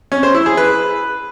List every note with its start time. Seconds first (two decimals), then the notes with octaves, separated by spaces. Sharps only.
0.12 C#4
0.23 C5
0.34 E4
0.46 G#4
0.57 B4